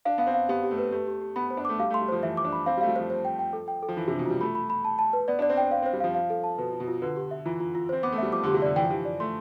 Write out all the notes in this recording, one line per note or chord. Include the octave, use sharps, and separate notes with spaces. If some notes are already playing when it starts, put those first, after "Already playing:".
D4 F5
B3 F5
C4
F5
B3 G4
G4
A3
B4
A3 G4
G4
G4
B3 B5
C5
D4
A3 D6
G3 F5
A3 C6
G3
F3 C5
E3 E5
D6
D4
B5
C4 F5
G3
A3 F5
G3
F3 C5
C5
G5
G5
A4
G5
A4
F3
E3 F4
C3 D4
B2
G3 F4
A3 B5
B5
B5
A5
A5
B4
B3 D5
D4 D5
C4
D4 G5
C4 F5
C4 C5
G3
F3 F5
F5
A4
A5
B2 B4
F4
B2
F4
D3 B4
G4
E5
E3 F4
F4
F4
C4 C5
B3 D6
A3
G3 E5
F3 D6
D3 G4
C3
D3 D5
E3 G5
F3
E3 G4
D5
A3 C6